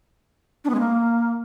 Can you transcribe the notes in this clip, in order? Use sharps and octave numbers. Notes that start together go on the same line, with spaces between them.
D4
B3
G#3
A#3